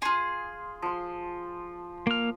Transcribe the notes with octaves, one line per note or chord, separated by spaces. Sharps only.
F4 G#4 C6
F3 C6
A#3 F6